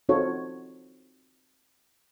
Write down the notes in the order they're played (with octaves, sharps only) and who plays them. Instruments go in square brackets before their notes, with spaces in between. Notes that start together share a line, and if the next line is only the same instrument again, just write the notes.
[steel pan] C4 D#4 F4 F#4 A4 C#5